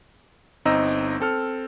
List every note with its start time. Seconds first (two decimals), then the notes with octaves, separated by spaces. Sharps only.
0.65 G1 C4 D#4 D#5 A#5 E6
1.20 C4 A4 F6